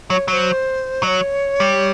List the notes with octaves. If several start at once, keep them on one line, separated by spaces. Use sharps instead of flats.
F#3 C#5
F#3 C5 C#5
F#3 C#5 D#5
G3